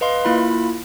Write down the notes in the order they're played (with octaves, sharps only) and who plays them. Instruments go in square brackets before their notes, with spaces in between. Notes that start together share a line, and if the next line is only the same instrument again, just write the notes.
[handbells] B4 D#5 F5 C6
A#3 E4 F4 B5